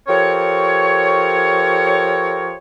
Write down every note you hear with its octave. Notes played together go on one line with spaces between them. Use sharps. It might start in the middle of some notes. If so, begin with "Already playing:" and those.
F3 G4 A4 A#4 C#5